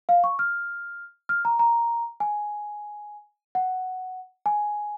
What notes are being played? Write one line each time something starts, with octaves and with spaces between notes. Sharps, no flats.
F5
C#6
F6
F6
A#5
A#5
G#5
F#5
G#5